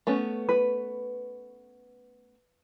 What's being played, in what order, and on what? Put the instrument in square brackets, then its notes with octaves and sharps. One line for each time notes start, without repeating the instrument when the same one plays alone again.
[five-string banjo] A3 B3 C#4
[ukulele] B4